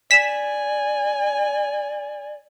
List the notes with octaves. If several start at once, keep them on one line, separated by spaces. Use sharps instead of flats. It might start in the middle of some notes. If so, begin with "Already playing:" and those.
D5 G#5 B6 E7